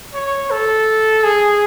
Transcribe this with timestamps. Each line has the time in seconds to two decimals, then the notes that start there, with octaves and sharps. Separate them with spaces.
0.14 C#5
0.51 A4
1.23 G#4